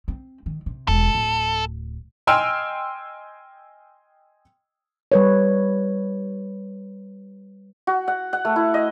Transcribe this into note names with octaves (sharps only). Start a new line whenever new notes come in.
C4
D#3
C3
E1 A4
D1
D#5 G5 G#5 C6 E6 F6
G3 B4 C#5
F#4
F#5
F#5
A3
E4
D#5